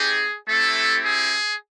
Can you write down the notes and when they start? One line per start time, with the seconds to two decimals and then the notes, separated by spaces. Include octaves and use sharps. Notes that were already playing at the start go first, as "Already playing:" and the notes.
Already playing: C4 D#4 G4 G#4
0.48 A3 C4 E4 G4 A4
1.04 G#4